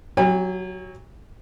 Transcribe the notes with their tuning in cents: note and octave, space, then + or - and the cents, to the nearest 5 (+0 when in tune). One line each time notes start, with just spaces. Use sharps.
F#3 +0 G4 -30 G#5 -45